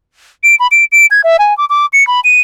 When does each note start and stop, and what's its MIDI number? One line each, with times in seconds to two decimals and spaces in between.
0.43 0.55 98
0.60 0.67 83
0.71 0.85 98
0.92 1.06 98
1.11 1.21 92
1.24 1.37 76
1.39 1.56 80
1.57 1.65 86
1.70 1.86 86
1.93 2.06 97
2.07 2.20 83
2.24 2.40 99